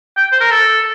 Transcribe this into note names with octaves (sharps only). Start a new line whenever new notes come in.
G5
C5
A#4
A4